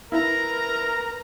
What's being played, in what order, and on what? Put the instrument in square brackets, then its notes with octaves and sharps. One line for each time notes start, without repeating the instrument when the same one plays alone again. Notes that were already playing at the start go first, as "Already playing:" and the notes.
[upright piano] E4 [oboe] A#4 [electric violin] B4 A#5